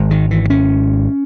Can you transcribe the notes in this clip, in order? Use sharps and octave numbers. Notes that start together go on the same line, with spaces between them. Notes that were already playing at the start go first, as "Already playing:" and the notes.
Already playing: G#1 G#2
D#3
E3
C#4